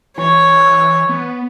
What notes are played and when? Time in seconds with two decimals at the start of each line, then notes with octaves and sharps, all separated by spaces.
0.18 E3 C#5
1.09 B3